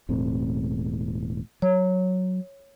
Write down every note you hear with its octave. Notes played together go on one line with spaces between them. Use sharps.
E1 A2 C4
F#3 C#5